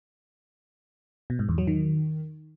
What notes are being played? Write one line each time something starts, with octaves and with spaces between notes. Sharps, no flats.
B2
G#2
E2
F#3
D#3